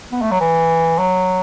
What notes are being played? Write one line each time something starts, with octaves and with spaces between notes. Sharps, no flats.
B3
A3
F#3
E3
F#3